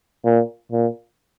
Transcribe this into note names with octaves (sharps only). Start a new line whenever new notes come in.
A#2
A#2